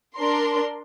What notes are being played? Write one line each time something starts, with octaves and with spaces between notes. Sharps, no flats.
D4 A#4 C6